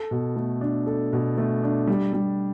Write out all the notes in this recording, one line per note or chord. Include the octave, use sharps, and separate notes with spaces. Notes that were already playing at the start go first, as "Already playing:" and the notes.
Already playing: A4
B2
A3
D4
A4
B2
A3
D4
G3
G3